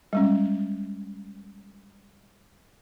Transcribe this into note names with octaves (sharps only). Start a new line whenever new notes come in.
G3 G#3 C#4